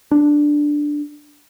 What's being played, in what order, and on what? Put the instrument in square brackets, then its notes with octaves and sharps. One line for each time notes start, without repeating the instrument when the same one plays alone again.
[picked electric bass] D4